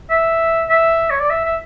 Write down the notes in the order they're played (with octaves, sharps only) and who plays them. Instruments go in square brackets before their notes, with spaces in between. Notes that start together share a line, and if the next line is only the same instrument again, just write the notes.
[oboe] E5
E5
C#5
D5
E5
E5